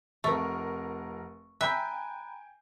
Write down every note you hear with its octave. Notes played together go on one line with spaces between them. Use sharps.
F1 A3 A#4 C#6
E5 G5 G#5 A#5 B5 F#6 G6